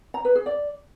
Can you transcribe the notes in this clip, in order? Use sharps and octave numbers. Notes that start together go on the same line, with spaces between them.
A#5
B4
G#4
D5